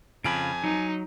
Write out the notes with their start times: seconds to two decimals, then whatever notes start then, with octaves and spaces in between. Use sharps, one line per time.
0.24 F2 C#3 F4 G#5 B5 D7
0.64 F#3 D#4